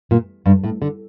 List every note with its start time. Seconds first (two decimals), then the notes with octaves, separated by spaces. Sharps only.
0.11 A#2
0.46 G2
0.64 A2
0.82 D3